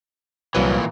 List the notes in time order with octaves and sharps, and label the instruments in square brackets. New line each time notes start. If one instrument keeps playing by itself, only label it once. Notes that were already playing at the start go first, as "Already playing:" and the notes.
[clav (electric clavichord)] C2 F#3 B4 [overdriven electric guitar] A#2 E3